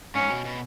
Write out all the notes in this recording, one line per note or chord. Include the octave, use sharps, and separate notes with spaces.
G#2 C#4
B2
B2